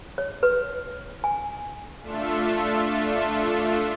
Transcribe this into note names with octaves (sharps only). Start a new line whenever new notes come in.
C#5
B4
G#5
A3 D4 F4 A4 E5